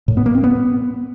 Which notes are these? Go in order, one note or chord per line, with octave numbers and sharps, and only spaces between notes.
A2
B3
A#3
C4
B3